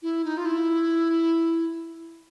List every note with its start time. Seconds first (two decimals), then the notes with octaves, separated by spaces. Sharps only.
0.02 E4
0.25 D#4
0.37 F4
0.45 E4